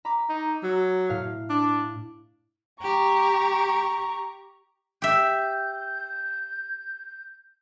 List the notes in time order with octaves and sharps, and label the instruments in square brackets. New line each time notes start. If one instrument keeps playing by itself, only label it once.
[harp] A#5 B5 D6
[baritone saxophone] D#4
[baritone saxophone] F#3 [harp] E6
[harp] A2 F5
[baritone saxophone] D4
[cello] G4 [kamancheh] A#5 C#6
[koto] G4 E5 [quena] G6